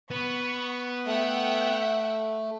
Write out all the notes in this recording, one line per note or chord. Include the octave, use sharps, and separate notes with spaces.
B3 B5 C#6
A3 E5 F#5 G5